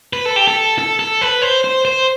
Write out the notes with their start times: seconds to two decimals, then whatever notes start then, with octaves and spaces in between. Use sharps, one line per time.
0.13 B4
0.25 A4
0.36 G4
0.48 A4
0.78 A4
0.99 A4
1.21 B4
1.42 C5
1.64 C5
1.85 C5